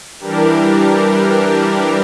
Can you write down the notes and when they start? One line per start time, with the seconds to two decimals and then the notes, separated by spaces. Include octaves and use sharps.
0.20 E3 G3 D4 G4 A#4